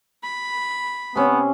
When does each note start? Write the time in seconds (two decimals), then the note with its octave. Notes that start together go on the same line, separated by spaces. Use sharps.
0.23 B5
1.16 C3 B3 C#4